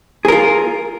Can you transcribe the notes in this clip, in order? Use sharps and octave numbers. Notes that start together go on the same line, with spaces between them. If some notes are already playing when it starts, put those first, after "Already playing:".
F4 G#4 A#4